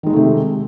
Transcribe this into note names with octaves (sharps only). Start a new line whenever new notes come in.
C3 D#3 G#3 A3 D#4